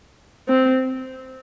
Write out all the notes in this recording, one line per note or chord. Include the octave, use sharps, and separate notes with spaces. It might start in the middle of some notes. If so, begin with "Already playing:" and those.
C4